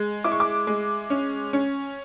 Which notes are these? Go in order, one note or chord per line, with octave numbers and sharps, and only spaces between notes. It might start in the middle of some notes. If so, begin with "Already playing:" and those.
Already playing: G#3
E4 D6
C#6
D6
G#3
C#4
C#4